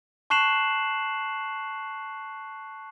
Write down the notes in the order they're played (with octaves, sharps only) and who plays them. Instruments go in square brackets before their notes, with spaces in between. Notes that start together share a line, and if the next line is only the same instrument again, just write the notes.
[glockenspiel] A5 C#6 F#6 C7 E7 F#7